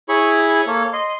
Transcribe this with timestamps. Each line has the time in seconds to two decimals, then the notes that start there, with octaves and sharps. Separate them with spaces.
0.09 E4 G#4 C#5 B5 C#6
0.67 A#3 A4 C#5
0.93 D#5 C6